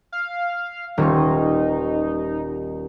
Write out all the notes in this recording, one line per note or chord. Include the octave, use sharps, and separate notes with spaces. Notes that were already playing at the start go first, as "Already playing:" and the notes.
F5
D#1 G3 D#4 C#6